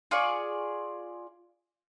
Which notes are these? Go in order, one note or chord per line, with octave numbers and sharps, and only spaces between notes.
F4 G#4 D5 C#6